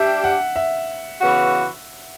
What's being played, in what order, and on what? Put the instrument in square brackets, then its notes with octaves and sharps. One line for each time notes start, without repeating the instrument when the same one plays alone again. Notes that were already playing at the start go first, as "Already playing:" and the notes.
Already playing: [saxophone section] G3 D4 G4 [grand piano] E5
[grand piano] F#5
E5
[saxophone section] C#3 E3 B3 F#4